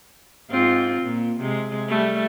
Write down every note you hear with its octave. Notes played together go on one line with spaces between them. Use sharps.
G#2 C4 F4
A#2
C3 G#3
G3 A3